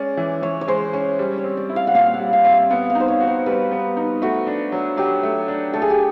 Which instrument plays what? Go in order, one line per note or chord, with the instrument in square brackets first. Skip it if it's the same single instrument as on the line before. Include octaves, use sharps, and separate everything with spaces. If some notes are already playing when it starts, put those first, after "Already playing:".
Already playing: [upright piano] G#3 C#4 [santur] D5
[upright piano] E3
[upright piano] E3 [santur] C#5
[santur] C#5
[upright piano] G#3 [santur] C5
[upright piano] C#4 [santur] C#5
[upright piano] G3
[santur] C#5
[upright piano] C4
[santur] D5
[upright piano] E4
[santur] F5
F#5
[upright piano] A#2 [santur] F5
[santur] F#5
[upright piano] G3
[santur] F5
[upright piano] C4 [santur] F5
[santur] E5
[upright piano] B3 [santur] F5
[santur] F5
[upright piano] D#4
[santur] C5
C#5
[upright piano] F#4
[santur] C5
[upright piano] G3 [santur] B4
[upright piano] B3
D#4
[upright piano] A3 [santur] F#4
[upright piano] D4
F#3
[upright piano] F#3 [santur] G4
[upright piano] A3
D4
[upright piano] A3 [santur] A4
[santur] G#4
G4